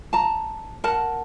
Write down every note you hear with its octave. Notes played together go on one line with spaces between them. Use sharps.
A5 A#5
A#4 F#5 A5